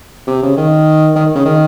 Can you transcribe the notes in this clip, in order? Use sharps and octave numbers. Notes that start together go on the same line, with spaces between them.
C3
C#3
D#3
D#3
C#3
D#3